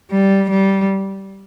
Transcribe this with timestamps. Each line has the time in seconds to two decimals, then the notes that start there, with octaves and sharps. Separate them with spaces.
0.11 G3
0.50 G3